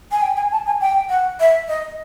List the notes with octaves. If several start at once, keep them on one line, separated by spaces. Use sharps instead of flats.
G#5
G5
G#5
A5
G#5
G5
F#5
E5
D#5